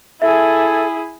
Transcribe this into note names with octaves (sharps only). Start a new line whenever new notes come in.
E4 G#4 A4 E5 G#5